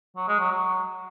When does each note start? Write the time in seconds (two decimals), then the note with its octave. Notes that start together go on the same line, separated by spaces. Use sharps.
0.16 F#3
0.28 G#3
0.40 F#3
0.52 F#3